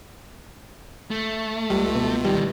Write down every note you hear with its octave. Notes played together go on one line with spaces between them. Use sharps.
A3
C#2 G3
B2
D#3 E3 G3